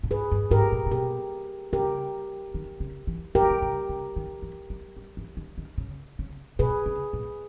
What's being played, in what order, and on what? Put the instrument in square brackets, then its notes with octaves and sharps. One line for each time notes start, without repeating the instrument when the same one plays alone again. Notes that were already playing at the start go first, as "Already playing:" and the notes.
[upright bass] A#2
[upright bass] G#2 [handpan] G#4 B4
[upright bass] G2
[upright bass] G#2 [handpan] G4 A#4
[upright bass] A#2
A#2
[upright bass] B2 [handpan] G4 A#4
[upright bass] C#3 [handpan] G4 A#4
[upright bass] D#3
C#3
E3
[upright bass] D#3 [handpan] G4 A#4
[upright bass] C#3
D#3
C#3
C#3
D#3
E3
G3
G3
E3
D#3
D#3
C#3
C#3
[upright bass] B2 [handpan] G#4 B4
[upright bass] C#3
A#2